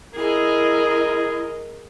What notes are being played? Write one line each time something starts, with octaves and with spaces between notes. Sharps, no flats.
E4 G#4 A#4 D#5